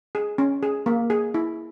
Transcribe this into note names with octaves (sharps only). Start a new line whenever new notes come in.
G#4
C#4
G#4
A#3
G#4
E4